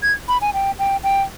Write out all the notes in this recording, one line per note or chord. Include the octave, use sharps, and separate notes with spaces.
G#6
B5
G#5
G5
G5
G5